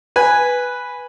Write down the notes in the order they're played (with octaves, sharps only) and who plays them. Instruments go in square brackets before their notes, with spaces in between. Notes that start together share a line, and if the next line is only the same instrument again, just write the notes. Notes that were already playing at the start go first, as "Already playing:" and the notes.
[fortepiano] B4 G#5